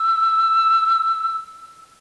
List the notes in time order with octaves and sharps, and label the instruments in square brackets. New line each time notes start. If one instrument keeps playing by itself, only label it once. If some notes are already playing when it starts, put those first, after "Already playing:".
Already playing: [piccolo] E6